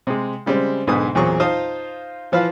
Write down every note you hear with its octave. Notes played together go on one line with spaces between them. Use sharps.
C3 G#3
C#3 G3 G#3 C4
B1 G#2 D3 G#3 B3 D#6
E2 A#2 F#3 C4 G#4 C#6
D#4 F4 C5 F5 A5 D#6
E3 F3 B4 F5